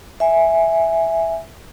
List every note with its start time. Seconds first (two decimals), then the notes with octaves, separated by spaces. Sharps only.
0.20 E5 G#5